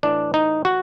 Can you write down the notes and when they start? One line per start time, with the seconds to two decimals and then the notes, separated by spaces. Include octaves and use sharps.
0.03 A2 E3 D4
0.34 D#4
0.65 F#4